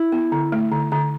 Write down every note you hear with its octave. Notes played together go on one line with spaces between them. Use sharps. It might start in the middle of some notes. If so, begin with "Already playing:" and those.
Already playing: E4
B3
D3
A3
D3
D3